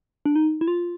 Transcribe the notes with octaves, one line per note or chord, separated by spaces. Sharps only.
D4
D#4
E4
F4